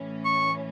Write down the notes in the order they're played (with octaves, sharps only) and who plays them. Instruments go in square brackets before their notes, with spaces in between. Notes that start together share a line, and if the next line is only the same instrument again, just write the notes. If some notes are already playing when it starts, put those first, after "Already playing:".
Already playing: [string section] A2 E3 C#4
[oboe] C#6